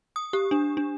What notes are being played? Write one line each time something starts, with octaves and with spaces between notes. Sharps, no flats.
D#6
G4
D4
D4